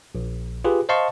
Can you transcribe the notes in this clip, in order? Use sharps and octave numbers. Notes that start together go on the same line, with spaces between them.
A#1
F4 G4 G#4 B4
C5 D#5 F5 A5 C6 C#6